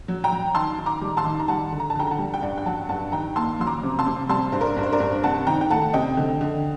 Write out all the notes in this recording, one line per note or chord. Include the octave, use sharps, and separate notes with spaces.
F#3
G5 A#5
F#3
D#3 A5 C6
D#3
A#5 D6
G3
A5 C6
D#3
A#5
G3 F#5 A5
D3
A#5
A5
D3 G5 A#5
A#5
F#5 A5
G3
G5
G2 D5 F#5
G5
F#3 F#5 A5
G2 F#5 A5
D#3 G5 A#5
A#3 A5 C6
F#3 C6
A#5 D6
C3
A5 C6
C3
G3 A5 C6
G2 C5
A#4 D5
G2
C5
A#4 D5
G2
C3 F#5 A5
D#3 G5 A#5
G5
A3 F#5 A5
C3 D#5 G5
D3
D3